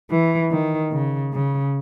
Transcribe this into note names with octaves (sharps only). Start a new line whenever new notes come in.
E3
D#3
C#3
C#3